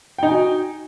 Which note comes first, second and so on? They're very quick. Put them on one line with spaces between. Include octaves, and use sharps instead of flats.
G5 D#4 G#5 F#4